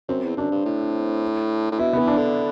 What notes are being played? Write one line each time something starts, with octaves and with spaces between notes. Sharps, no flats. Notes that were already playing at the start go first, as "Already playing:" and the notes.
F#2 C4
E2
F#2 D4
G2
A2
A2
B2 E4
E3 B3
D4
D3